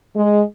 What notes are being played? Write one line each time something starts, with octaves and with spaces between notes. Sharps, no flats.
G#3